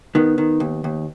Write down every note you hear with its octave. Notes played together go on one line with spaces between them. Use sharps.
D#3 B3
D#3
D#2
D#2